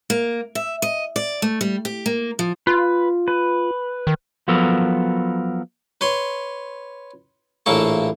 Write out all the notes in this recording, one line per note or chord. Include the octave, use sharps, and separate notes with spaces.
A#3
E5
D#5
D5
A3
G3
G4
A#3
F3
F4 B4
B4
D#3
F3 F#3 B3 A4 A#4
B4 C#5 C6
A#1 A2 E3 A#3 A5 C#6